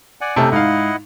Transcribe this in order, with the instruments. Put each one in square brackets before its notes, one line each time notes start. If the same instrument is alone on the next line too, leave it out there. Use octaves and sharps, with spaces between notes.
[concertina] D5 F#5 G#5
[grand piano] C3 A3 A4 [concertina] C4 C#4 D#4
[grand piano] G#2 F5 [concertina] E4 D#5 F#5